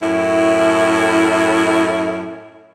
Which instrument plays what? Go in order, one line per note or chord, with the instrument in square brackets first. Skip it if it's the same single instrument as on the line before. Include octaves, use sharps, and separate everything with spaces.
[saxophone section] F#2 A2 E4